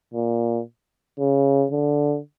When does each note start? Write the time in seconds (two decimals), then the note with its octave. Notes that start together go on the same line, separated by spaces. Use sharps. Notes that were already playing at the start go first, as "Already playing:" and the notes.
0.14 A#2
1.19 C#3
1.72 D3